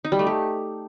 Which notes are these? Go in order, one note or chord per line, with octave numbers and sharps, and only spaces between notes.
D#4
G3
A3
G4